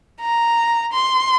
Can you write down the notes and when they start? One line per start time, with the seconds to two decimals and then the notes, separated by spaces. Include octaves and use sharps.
0.21 A#5
0.93 C6